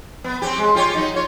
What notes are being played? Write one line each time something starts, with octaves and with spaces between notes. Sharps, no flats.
B3
C4 C#4 G4
G#3
F4 G4 C#5
F#3 D#4
F4 C#5